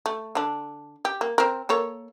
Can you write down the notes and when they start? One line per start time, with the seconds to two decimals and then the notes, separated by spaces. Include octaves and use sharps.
0.06 A3
0.35 D3 D4
1.05 G4
1.21 A#3
1.38 C4 A#4
1.69 A#3 A4 C#5